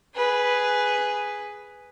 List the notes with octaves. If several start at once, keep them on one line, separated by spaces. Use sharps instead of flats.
G#4 B4